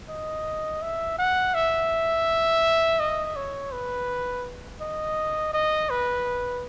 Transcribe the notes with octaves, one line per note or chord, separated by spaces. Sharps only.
D#5
E5
F#5
E5
D#5
C#5
B4
D#5
D#5
B4